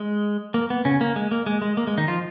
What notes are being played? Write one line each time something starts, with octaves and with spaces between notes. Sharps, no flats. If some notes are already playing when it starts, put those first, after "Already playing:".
Already playing: G#3
A#3
B3
C#3 C#4
A#3
G#3
A#3
G#3
G#3
A#3
G#3
D#3 D#4
F3 F4